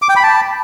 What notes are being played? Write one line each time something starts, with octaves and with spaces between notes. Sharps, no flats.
D6
G5
B5
A5